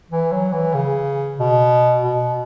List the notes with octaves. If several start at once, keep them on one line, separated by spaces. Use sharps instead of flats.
E3
F#3
E3
C#3
B2
B2